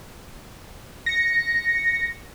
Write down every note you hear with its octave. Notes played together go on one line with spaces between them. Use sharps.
A#6 C#7